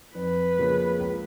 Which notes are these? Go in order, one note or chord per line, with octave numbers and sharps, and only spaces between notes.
F2 B4
C#3 F3 A#3
C#2